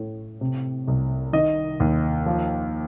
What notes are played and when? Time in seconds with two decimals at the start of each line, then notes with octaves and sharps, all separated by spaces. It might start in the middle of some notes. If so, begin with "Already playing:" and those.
Already playing: A2
0.41 C3
0.88 C2
1.33 D#3 D#5
1.80 D#2
2.26 F3